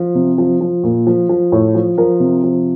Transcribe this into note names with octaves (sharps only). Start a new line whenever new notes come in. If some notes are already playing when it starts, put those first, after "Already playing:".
Already playing: F3
C3
F3
F3
A#2
F3
F3
A2
F3
F3 A#4
C3
F3